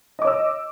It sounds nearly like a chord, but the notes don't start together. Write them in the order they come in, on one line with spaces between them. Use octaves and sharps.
D#5 D6 C#5 E6